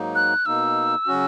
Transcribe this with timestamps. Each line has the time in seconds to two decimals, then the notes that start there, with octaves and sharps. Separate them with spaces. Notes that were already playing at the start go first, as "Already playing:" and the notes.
Already playing: G#2 F#3 A#3 D#4
0.15 F#6
0.46 B2 A#3 D#4 E6
1.07 C#3 F#3 C#4 F#4